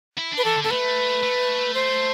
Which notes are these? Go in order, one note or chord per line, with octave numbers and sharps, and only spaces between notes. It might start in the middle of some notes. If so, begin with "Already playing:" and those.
E4
D4
B4
E3 A4
D3
B3 A4
A3 B4
A3
C5